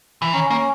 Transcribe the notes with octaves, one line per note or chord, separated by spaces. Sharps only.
E3
D#3 C#4
A#3 C#4